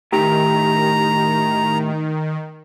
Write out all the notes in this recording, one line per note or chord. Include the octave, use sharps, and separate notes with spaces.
A2 D#3 G4 A#5